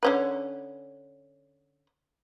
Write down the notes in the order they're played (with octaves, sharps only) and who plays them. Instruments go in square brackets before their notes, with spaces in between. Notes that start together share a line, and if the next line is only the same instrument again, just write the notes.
[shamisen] D3 C#4 B4